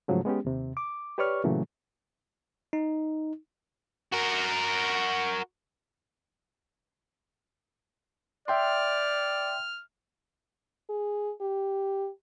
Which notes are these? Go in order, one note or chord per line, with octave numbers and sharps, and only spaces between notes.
G#2 C#3 F3 F#3 A3
G#3 B3 C#4 G4
D#2 C3
D6
G4 B4 C#5 D5 C#6 F6
A#2 C#3 E3 F#3 A3
D#4
F#4 A#4
D5 E5 G5 C6 F6
G#4
G4